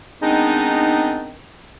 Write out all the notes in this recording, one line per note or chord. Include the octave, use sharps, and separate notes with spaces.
D#3 G#3 B3 C4 D4 D#4